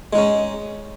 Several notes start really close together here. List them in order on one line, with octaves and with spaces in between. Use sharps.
G#3 D#4 C#4